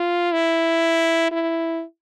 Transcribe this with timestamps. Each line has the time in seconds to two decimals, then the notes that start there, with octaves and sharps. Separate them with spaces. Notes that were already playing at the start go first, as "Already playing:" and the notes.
Already playing: F4
0.33 E4
1.32 E4